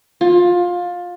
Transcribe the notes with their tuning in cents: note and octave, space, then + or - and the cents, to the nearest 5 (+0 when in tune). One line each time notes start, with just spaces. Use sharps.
F4 +20